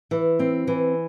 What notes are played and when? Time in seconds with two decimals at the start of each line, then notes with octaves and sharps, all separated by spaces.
0.11 E3
0.39 C4
0.67 E3